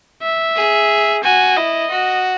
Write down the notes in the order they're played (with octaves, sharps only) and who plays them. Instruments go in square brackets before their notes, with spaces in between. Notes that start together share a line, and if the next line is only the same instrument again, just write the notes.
[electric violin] E5
[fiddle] G#4
[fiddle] F#4 [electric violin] G#5
[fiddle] E4 [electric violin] D#5
[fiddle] F#4